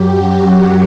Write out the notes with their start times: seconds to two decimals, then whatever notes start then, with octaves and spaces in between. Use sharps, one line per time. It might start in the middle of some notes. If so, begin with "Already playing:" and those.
Already playing: F#2 F#3 G4
0.14 F#4